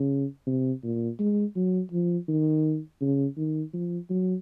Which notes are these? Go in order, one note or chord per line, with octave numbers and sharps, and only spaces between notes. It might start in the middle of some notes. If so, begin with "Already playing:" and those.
Already playing: C#3
C3
A#2
G#3
F#3
F3
D#3
C#3
D#3
F3
F#3